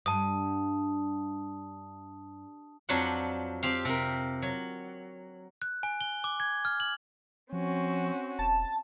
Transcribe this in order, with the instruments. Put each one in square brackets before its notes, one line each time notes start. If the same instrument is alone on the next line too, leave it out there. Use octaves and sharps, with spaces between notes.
[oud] G2 [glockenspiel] A5 D#6
[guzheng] F2 F#3 D4 C5 F#5
C4 G4 F5
C3 A#4
F#3
[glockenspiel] F#6
G#5
G7
D6
G#6
F6
F#7
[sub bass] F3 [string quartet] C4 C#4 F#4
[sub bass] E1 [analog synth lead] A5